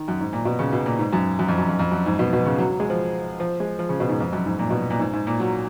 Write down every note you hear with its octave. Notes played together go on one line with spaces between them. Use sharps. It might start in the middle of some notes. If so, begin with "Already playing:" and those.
Already playing: D#3
F#2
G#2
A#2
B2
C#3
B2
A#2
G#2
F#2
F#2
F2
F#2
F2
F2
F#2
G#2
B2
B2
C#3
F#3
F#3
G#3
F3
F3
G#3
F3
C#3
B2
G#2
F2
F#2
G#2
A#2
B2
A#2
G#2
G#2
A#2
F#3